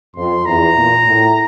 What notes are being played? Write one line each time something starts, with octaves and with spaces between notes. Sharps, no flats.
F2 C6
E2 A#5
A#2
A2